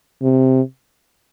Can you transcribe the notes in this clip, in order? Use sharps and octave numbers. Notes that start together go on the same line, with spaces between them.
C3